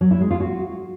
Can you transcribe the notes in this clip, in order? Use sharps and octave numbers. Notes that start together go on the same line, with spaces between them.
F#3
E4
G#3
F4
F#4